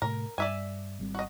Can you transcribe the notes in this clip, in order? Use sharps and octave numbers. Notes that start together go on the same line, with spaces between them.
A2 C3 A3 A#4
G2 D5 E5 G#5
G#1 G3 C4
F#4 D#5